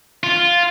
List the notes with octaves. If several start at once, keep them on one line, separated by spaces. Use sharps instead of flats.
F4